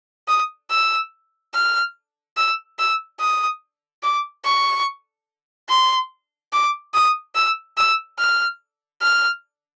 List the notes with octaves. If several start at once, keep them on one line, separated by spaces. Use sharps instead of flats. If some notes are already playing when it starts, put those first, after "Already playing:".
D#6
E6
F6
E6
E6
D#6
D6
C#6
C6
D6
D#6
E6
E6
F6
F6